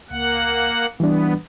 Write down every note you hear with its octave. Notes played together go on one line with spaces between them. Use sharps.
C#2 A#3 F#5
E3 G3 B3 D4